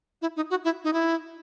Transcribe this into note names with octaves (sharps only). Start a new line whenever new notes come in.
E4
D#4
F#4
E4
D#4
E4